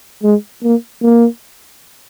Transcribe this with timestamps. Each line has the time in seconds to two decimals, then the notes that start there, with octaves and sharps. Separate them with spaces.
0.23 G#3
0.63 A#3
1.02 A#3